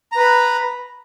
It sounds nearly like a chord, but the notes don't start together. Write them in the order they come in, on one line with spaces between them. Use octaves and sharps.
A#5 B4 B5